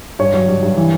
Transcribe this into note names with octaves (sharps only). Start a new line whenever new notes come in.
G2 C#5
F#3
G2
G2
E3